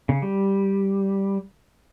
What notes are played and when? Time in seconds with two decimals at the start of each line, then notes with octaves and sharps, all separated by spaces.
0.09 C#3
0.22 G3